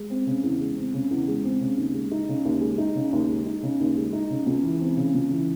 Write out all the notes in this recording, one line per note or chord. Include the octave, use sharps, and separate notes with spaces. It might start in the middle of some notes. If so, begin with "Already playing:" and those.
Already playing: G#3
C4
C#3
E2
G#3
C4
C#3
E2
G#3
C4
C#3
D#2
G#3
D#4
C#3
D#2
G#3
D#4
C#3
D#2
G#3
D#4
C#3
D#2
G#3
D#4
C#3
C#2
E3
C4
C#3
C#2
E3